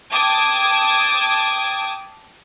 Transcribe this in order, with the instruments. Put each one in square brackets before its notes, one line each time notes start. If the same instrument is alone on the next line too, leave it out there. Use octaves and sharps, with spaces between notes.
[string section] G5 A5 D6 D#6 G#6